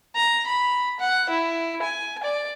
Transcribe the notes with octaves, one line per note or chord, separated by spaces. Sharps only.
A#5
B5
F#5
E4
G#5
D5